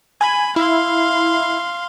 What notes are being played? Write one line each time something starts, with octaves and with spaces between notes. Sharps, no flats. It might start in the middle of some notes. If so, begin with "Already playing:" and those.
G#5 B5
E4 F5 C6